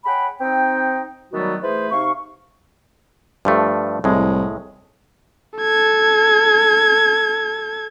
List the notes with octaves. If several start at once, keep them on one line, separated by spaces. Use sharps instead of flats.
G#4 C#5 F#5 G5 B5
C4 D#4 G5
D#3 F#3 G3 A3 B3 F#4
E3 A3 G#4 B4 C5
C3 D#4 F5 C#6
G2 F3 A3
C2 A2 G#3
A4 G#6